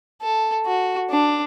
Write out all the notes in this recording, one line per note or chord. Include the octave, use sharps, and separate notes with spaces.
A4
F#4
D4